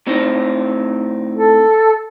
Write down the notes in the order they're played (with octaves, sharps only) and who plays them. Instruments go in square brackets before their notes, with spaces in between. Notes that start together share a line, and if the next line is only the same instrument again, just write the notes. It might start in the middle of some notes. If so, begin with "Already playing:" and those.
[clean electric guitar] A2 C4 D#4
[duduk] A4